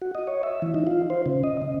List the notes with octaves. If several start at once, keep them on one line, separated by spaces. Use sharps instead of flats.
F#4
D#5
C#5
E5
E3
D#4
F4
C5
C#3
D#5
C#3